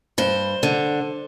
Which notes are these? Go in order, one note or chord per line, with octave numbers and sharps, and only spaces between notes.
G2 C5
D3